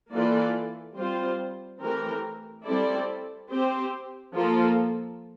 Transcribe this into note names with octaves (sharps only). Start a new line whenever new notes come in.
E3 A#3 F4 A4 D5
G3 C4 F4 C5
E3 A3 C4 G4 A#4
G3 C4 E4 A4 D5
C4 G4 C5
F3 A#3 F4 A4